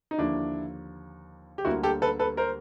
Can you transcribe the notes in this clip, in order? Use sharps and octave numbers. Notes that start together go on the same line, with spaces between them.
D#4
D#2 D3 F3 A#3 D4 E4
G4
D2 D3 G3 A#3 E4 F#4
G4 A4
A4 B4
A4 B4
A#4 C5